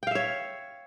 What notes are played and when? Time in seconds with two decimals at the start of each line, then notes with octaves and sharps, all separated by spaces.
0.03 G5
0.07 F5
0.11 E5
0.15 C#5